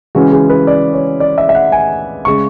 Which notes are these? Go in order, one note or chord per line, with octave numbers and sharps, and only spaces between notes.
C#3 E3 G#3 C#4 F#4
G#4
B4
D5
C#5
D5
E5
E5
F#5
G#5
C#3 G#3 C#6